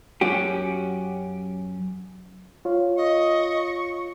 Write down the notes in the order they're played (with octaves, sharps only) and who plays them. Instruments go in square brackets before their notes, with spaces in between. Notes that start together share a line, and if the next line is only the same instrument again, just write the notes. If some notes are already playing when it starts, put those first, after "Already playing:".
[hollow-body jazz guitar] F#2 C#4 F#4 G4
[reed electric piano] F4 C#5 F5
[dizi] D#5 [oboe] C#6